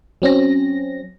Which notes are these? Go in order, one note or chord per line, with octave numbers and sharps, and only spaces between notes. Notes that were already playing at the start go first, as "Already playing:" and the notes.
F#3 C4 C#4 A#6